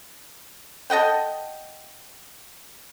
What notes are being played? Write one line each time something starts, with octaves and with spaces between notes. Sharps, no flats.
A4 D#5 F#5 G5